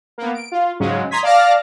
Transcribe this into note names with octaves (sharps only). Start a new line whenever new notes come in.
A#3 B3
D7
F4
G#2 C#3 F#3 G#3 C#4
A#5 C6 D#6 G#6 B6
D5 F5 A5 D6 F6 A#6